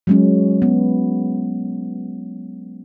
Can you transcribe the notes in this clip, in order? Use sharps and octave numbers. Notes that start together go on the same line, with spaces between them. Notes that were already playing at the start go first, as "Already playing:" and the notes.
F#3 G#3 C#4
B3